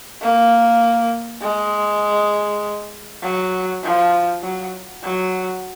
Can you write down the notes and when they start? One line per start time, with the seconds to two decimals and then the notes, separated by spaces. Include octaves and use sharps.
0.21 A#3
1.41 G#3
3.23 F#3
3.83 F3
4.43 F#3
5.03 F#3